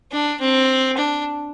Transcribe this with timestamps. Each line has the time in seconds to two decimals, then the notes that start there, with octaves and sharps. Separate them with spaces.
0.12 D4
0.40 C4
0.97 D4